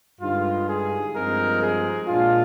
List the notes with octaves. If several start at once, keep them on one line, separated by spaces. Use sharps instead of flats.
G2 D3 G#3 D#4 F4
G#4
G2 F3 G#3 C4 D#4 A#4
G#4
A#2 G#3 D4 F4